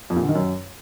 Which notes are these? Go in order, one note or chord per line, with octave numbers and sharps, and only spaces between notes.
F2
A#2
D3
D#3
F#2